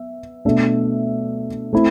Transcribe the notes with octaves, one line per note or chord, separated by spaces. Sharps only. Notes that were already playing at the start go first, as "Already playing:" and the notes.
Already playing: B3 E5
B2 A3 D4 A4 E5
A3 C4 E4